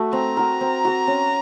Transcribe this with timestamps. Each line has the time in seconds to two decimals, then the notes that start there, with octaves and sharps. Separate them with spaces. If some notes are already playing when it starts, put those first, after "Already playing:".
Already playing: A3 F#4
0.13 C4 A#5
0.37 F#4 A#4
0.61 C4
0.85 F#4 A#4
1.07 C#4